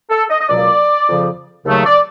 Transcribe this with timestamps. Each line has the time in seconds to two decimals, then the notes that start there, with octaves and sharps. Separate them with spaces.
0.10 A4
0.30 D#5
0.40 D#5
0.49 C#2 B2 F#3 A#3 D5
1.08 F2 C#3 F3
1.65 D#2 C#3 F#3 A3
1.86 D5